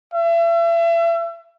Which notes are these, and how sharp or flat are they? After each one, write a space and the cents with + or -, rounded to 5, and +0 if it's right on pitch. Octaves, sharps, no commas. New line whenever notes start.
E5 +35